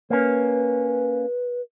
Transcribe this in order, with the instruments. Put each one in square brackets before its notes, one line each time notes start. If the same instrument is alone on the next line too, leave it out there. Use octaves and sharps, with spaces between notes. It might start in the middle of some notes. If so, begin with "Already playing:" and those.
[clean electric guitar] A#3 C#4 [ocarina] B4